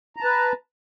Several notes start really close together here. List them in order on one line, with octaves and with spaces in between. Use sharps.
A#5 A5 B4